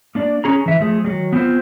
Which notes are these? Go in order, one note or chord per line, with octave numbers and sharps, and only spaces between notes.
A#3 D4 D5
C#4 G#4 A#5
E3 E5
F3 A3 G#4
D#3 F#3 G3
B3 C4 F4 C5